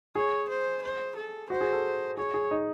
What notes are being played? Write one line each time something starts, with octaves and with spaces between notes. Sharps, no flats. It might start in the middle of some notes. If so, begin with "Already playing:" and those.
G#4 C#5
C5
C5
A4
F#4 C5
G#4
A4
G#4 C#5
G#4
D#4